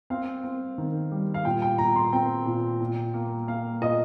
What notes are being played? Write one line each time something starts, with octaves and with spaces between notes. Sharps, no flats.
C4 F5
C4
D#3
G3
F5
A#2 G5
G5
A#2 A#5
C6
C4 G5
A#2
A#2
A#3
A#3 F5
A#2 D#5